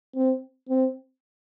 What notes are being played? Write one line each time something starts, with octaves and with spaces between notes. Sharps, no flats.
C4
C4